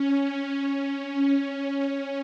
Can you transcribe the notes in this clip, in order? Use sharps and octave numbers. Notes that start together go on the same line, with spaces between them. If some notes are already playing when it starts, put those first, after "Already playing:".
Already playing: C#4
C#4